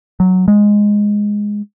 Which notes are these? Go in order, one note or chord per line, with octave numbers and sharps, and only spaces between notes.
F#3
G#3